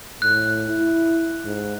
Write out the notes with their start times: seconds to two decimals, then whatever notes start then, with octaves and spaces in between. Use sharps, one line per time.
0.22 A2 F#6
0.69 E4
1.45 G#2